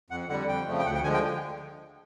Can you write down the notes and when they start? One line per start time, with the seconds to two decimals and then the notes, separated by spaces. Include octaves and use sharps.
0.10 F2 F#5
0.29 D3 G3 F#5
0.48 F2 G5
0.67 C#3 F3 A3
0.79 G5
0.86 D2 F#5
0.95 G5
1.04 D3 F3 G#3 G#5
1.14 G5